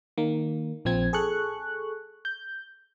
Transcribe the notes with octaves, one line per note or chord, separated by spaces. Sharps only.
D#3 A#3
A#1 F3 C4 G#6
G#4 A4 C#6 F#6
G6